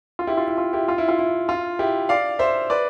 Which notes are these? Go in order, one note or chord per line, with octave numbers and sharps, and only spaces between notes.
F4
E4 G4
F4
E4
F4
E4 G4
F4
E4
F4
E4
F4
E4 G4
D5 F5
C5 E5
B4 D5